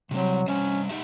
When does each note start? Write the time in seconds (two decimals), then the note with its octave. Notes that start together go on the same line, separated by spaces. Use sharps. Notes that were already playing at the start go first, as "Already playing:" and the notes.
0.11 C3 F#3 G3 C4
0.48 G3 C#4 C5 C#5
0.89 D#4 G4 E5